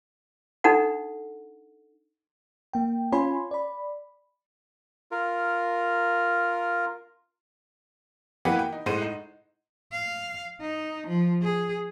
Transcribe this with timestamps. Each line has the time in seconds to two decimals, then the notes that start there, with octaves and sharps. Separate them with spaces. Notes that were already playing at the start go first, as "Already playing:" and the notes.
0.64 D4 D#4 A4 F#5
2.73 A#3 G5
3.12 C#4 F4 C#5 G#5 B5 C6
3.51 D5 B5
5.11 F4 A#4
8.45 E3 A#3 B3 F#4 G4 B4
8.59 G5
8.72 D#4
8.86 A2 G#3 C5 F#5 C6 D#7
9.02 D#4
9.93 F5
10.62 D#4
11.07 F3
11.43 G#4